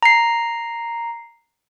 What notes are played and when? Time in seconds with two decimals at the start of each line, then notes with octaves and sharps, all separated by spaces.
0.03 A#5 C7